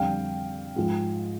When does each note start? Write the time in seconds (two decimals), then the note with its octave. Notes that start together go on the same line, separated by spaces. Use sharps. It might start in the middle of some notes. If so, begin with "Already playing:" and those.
Already playing: F2 D3 G3 F5 G5
0.76 G#2 F3 G#3